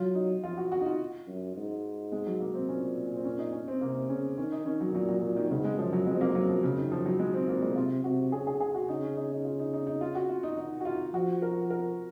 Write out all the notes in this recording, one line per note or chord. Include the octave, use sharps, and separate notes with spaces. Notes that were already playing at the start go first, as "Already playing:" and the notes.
Already playing: F#3 F4
D#4
F3 F4
F#4
D#3 F#4
D#4
F4
F#2
G#2
G#3
F#3
A#3
C4
A#2 C#4
C4
C#4
D#4
C#4
C4
C3 A#3
C#3 C#4
D#3 C#4
D#4
D#3 C#4
F#3
A#2 F#3
F#3
A#2 F#3
D#3
G#2 C#3
G#3
F#2 F3
F#3
F2 G#3
C4
A#3
F#2 F#3
F3
F#2 C#3
D#3
F3
F#3
G#2 G#3
C4
A#2 A#3
G#3
C3 F4
C3 F#4
C#3 G#4
G#4
G#4
F#4
C#3 D#4
C#4
D#4
D#4
F4
D#4
D#4
D#4
F4
F#4
F4
D#4
D#3 D#4
F#4
F4
F3 F#4
A#4
A#4